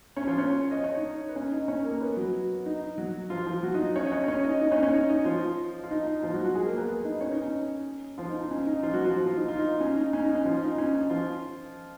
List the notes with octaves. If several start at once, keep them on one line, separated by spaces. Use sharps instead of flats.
C#4 C#5
F3 F4
C#4 C#5
D#5
C#5
D#4 D#5
B4
C#4 C#5
D#4 D#5
C#4 C#5
A#3 A#4
B3 B4
F#3 F#4
D#4
D#4
F#3 F#4
F3 F4
F3 F4
F#3 F#4
D#4 D#5
C#4 C#5
D#5
C#4 C#5
C#4 C#5
D#4 D#5
D#4 D#5
C#4 C#5
C#4 C#5
D#4 D#5
D#4 D#5
F3 F4
F4
D#4
D#4
F3 F4
F#3 F#4
F#3 F#4
G#3 G#4
A#3 A#4
B3 B4
B3 B4
D#4 D#5
C#4 C#5
D#4
C#4
F3 F4
D#4
D#4
C#4
D#4
F3 F4
F#3 F#4
F3 F4
F3 F4
D#4
F4
D#4
C#4
D#4
C#4
D#4
C#4
F3 F4
D#4
C#4
D#4
F3 F4